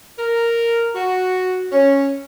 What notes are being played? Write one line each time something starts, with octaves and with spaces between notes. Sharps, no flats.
A#4
F#4
C#4